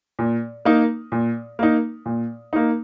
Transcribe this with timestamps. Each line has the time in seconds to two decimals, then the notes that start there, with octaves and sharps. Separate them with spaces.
0.19 A#2
0.65 A#3 D#4
1.12 A#2
1.59 A#3 D#4
2.06 A#2
2.53 A#3 D#4